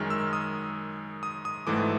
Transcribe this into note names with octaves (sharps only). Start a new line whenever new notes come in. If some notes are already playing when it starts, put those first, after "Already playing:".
Already playing: F#2 D#3 G#3 F6
E6
D#6
D#6
D#6
G#1 G#2 E3 A3 D6